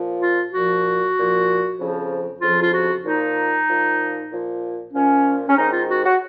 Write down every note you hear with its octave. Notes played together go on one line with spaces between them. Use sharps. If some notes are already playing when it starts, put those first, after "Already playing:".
Already playing: A#2 F3
F4
A#2 F3 F#4
A#2 F3
F2 C#3 F3
F2 C#3 F3 F4
F4
F#4
A#2 F3 D#4
A#2 F3
A#2 F3
A#2 F3 C#4
C#4
G#2 D#3 D#4
F4
F#4
F#4